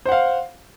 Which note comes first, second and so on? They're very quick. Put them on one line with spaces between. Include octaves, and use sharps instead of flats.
C5 F#5 F5